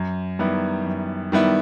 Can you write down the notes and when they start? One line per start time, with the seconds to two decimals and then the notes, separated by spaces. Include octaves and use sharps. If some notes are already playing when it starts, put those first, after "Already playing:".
Already playing: F#2
0.39 D#3 G3 B3 E4
0.85 F#2
1.32 D#3 G3 B3 E4